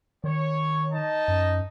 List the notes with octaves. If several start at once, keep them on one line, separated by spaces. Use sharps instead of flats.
D#3 C#5
D#4 D#5 A5
F#2